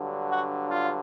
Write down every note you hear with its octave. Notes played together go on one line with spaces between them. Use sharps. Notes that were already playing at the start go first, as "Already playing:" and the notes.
Already playing: G2 D3 F#3
F#4
F4